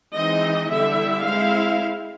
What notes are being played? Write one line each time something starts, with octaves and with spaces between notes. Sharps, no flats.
E3 G#3 C4 D#4 D#5
D3 G3 B3 E4 E5
G#3 C4 E4 F5